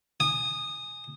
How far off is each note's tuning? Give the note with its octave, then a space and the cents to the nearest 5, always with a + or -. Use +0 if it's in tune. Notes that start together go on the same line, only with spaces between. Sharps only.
G#5 +0 D#6 -15